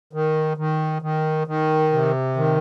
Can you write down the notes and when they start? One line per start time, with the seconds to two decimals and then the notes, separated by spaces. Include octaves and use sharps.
0.13 D#3
0.57 D#3
1.02 D#3
1.47 D#3
1.92 C3
2.37 D#3